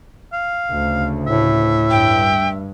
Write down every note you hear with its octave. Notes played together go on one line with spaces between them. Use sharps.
F5
D2 C#3
A2 E5
G2 G5